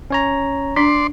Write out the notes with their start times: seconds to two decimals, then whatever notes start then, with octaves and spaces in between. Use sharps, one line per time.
0.10 C#4 C#5 A#5
0.76 D4 D5 C6